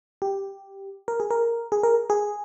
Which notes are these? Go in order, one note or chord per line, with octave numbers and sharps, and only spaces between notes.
G4
A#4
G#4
A#4
G#4
A#4
G#4